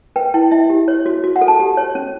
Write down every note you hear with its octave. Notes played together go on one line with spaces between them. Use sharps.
B4 G5
E4 G5
E4 E5
G4
C#5
F#4
F#4
F#5
A4
A5
G4
C#5
C#4